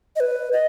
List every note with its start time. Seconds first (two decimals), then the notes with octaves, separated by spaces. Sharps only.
0.16 D#5
0.20 B4
0.52 D#5